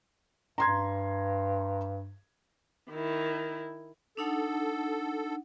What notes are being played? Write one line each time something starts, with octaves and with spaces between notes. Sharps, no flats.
G2 A#5 C6 G#6
D#3 E4
D4 D#4 A4 F#5